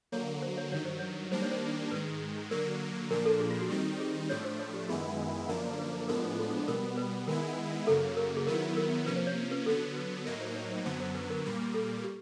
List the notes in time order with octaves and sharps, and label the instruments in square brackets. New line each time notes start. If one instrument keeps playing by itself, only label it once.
[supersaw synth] D3 F#3 A#3 [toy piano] C#5
[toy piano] C5
C#5
[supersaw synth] G2 D#3 F#3 [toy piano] C#5
[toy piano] C5
C#5
[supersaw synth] D#3 G3 A#3 D4 [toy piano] C5
[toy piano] C#5
C5
[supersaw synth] G#2 D#3 G#3 [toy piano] B4
[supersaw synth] D3 F#3 A#3 [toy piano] A#4
[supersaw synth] A#2 F3 A#3 D4 [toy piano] A#4
[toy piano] A4
G#4
F4
F#4
[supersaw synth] D#3 G3 C4 D#4 [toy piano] G4
[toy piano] G#4
[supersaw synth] A2 F3 A3 D4 [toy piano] C#5
[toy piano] C5
C#5
G4
[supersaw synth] F#2 D#3 G#3 B3 E4 [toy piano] G#4
[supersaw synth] F#2 D3 F3 A#3 D4 [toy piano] A#4
[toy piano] B4
[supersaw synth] A2 F3 G#3 B3 D4 [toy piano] A#4
[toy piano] A4
[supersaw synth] B2 G3 B3 [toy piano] A#4
[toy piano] B4
[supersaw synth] D#3 G#3 B3 E4 [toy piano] A#4
[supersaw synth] F#2 C#3 F#3 A#3 [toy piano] A4
[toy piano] A#4
G#4
[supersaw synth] D#3 F#3 B3 E4 [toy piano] A#4
[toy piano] A#4
[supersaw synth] C3 F3 A#3 C#4 [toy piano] B4
[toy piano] C5
C#5
B4
[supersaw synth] D3 F#3 B3 [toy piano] A4
[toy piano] B4
[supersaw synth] A2 F#3 A#3 D#4 [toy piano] A#4
[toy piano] C5
C#5
C5
[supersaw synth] F#2 D3 F#3 B3 [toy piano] C5
[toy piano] C5
B4
A#4
[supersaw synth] A#2 G3 A#3
[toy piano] A4
G4